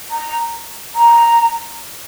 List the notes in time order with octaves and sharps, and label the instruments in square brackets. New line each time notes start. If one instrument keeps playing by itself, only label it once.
[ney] A#5
A#5